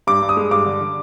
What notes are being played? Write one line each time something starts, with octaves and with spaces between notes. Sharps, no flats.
G2 D6
G2
D#6
G#3
G2 D6
D3
D3